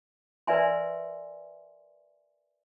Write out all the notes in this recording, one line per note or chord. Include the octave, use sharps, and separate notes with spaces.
A#4 B4 D5 E5 G#5 C6